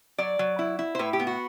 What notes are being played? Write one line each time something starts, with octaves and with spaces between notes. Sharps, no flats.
F#3 D5
F#3
E4
E4
C5
A2 B4
G4
B3
F#4